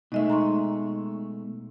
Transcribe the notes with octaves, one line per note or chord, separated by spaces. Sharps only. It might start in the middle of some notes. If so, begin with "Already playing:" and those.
B2 G#3 A3 D#4 D#5 E5
A#5 C6 C#6